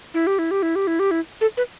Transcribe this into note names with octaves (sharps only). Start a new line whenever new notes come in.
E4
G4
E4
G4
E4
G4
E4
G4
E4
A4
B4